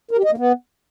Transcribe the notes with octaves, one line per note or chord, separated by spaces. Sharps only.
A#4
G4
D#5
A#3
B3